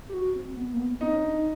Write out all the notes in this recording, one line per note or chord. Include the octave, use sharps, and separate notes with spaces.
G4
F#4
C4
B3
A#3
B3
C4 D#4 D#5
C#4
D4
D#4